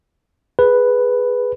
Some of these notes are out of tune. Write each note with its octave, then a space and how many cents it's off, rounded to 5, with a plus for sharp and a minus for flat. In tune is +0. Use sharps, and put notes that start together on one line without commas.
G#4 +0 B4 +0